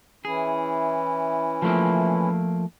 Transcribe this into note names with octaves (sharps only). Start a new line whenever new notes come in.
E3 C#4 E4 G#4
F3 A3 A#3